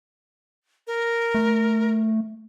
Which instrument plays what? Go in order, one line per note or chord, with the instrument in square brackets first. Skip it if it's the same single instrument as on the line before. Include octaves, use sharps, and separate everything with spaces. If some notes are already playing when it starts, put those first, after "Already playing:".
[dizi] A#4
[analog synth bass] A3